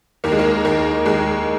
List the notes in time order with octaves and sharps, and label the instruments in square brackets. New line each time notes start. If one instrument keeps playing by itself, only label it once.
[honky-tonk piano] D#2 A#3
G#3
A#3
D#2 A#3
D#2 G#3